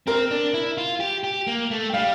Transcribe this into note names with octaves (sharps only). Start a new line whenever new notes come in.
C4 A#4
D4
E4
F4
G4
G4
A#3
A3
G5
G3 F5